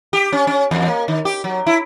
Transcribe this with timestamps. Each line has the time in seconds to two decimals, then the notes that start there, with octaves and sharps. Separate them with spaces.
0.13 G4
0.32 C#4
0.47 C#4
0.71 E2
0.88 A#3
1.08 D#3
1.25 G4
1.44 F#3
1.66 E4